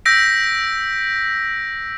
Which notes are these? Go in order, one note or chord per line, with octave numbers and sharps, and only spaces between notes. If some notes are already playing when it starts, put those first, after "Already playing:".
E6 G6 A#6 B6 D7